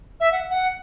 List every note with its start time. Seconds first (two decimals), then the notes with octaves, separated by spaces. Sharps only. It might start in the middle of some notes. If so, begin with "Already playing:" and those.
0.20 E5
0.32 F#5
0.50 F#5